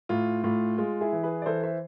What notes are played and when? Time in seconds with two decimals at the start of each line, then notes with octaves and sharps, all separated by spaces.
0.09 A2 F4
0.44 A2 F4
0.78 G#3 F4
1.01 E4 G#4
1.13 E3
1.23 G#4 B4
1.42 D5
1.46 E3 A4 C5
1.63 C5 E5